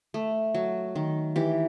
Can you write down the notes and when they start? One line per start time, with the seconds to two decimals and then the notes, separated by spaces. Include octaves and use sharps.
0.14 A3
0.54 F#3
0.95 D#3
1.36 E3 G4